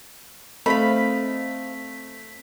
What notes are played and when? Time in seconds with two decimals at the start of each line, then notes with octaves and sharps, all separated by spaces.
0.66 A3 C4 D#4 C5 F5 B5 B6